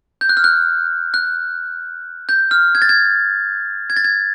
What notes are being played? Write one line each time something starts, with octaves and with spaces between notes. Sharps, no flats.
G6
F#6
F6
F#6
F#6
G6
F6
G#6
A6
G#6
G#6
A6
G#6